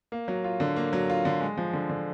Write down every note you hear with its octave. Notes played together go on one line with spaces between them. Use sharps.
A#3
F#3
F4
D3
A#3
F#3
F4
D3
G#3
F3
D3
D3